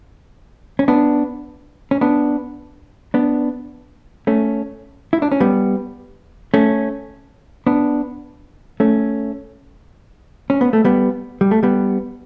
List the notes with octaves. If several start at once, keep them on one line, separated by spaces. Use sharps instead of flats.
C#4
B3 D4
C#4
B3 D4
B3 D4
A3 C#4
E4
D4
C#4
G3 B3
A3 C#4
B3 D4
A3 C#4
C#4
B3
A3
G3 B3
G3
A3
G3 B3